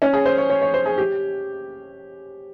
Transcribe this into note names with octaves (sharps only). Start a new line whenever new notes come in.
C#4
G#4
C5
C#5
C#5
C#5
C5
G#4
G4